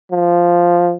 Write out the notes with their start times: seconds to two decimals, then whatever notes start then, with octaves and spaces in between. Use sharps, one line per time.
0.11 F3